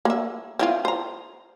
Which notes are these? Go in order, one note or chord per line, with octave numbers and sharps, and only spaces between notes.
A#3 E5
C4 E4 F4
C5 A#5